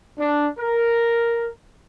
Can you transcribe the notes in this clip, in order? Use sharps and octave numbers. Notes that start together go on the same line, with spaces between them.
D4
A#4